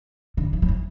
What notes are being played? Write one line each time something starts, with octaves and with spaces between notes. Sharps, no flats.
D3
E3
F#3
E3